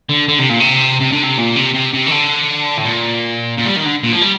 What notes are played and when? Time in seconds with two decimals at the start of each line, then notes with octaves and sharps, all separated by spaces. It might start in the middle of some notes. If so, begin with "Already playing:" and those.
0.09 D3
0.28 D3
0.39 C3
0.49 A#2
0.60 C3
1.01 C3
1.12 D3
1.24 C3
1.38 A#2
1.56 C3
1.74 C3
1.94 C3
2.06 D#3
2.11 D3
2.77 A2
2.85 A#2
3.58 A#2
3.66 G3
3.77 D#3
3.85 D3
4.04 A#2
4.13 F3
4.21 G3